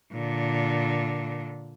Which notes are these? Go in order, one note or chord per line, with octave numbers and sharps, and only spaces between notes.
A#2 D3